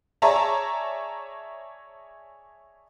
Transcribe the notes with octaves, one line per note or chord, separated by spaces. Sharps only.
G#4 C#5 D5 E5 A5 A#5